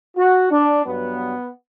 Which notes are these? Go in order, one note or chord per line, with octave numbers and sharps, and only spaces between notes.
F#4
D4
G2 F#3 B3